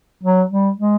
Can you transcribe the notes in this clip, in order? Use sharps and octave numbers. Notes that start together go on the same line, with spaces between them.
F#3
G3
G#3